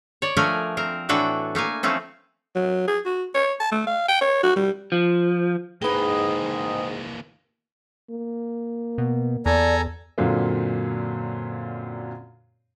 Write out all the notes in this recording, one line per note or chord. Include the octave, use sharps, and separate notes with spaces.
C#5 D5
F3 A3 D4 A#4 G#5
C4 A#4
A2 E3 D4 F#4 A4 G5
A3 A#3 F5 G#5
E3 F3 A3 C4 C#4
F#3
G#4
F#4
C#5
A5
A3
F5
G5
C#5
F#4
G3
F3
G#2 E3 A#3 G#4 B4 G5 D#6
A#3
B2
E2 A4 D5 G#5 A#5
F#2 A#2 D3 A#3 C4